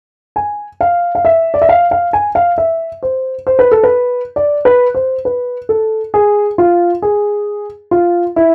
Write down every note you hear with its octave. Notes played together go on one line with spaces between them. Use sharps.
G#5
F5
F5
E5
D5
E5
F5
F5
G#5
F5
E5
C5
C5
B4
A4
B4
D5
B4
C5
B4
A4
G#4
F4
G#4
F4
E4